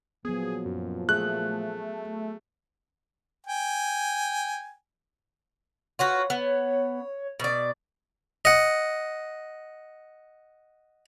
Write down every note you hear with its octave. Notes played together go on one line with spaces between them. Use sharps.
A#2 F3 F#3 B3 G#4
F#2
A3 G#4 F#6
G5 G#5
F4 F#4 B4 C#5
B3
B2 D5
D#5 F#5